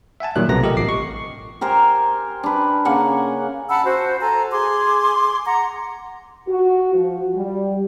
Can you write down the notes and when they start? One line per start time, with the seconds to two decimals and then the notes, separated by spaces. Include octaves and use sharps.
0.20 E5 F#5 G#5 A5
0.36 A#2 D#3 F#3 G3 F#6
0.49 B1 C3 A3 B3 A#5 A#6
0.63 F4 G4 A4 A#4 D#5
0.77 A1 D6 C7
0.89 C#6
1.61 G4 A#4 C5 G#5
2.43 D4 B4
2.85 C#3 A#3 F#5 G#5
3.69 F#5 A5 B5 E6
3.84 F#4 C5
4.21 A4 G#5 A#5
4.51 G#4 C6 D6
5.46 F#5 A#5
6.48 F#4
6.93 F3
7.35 G3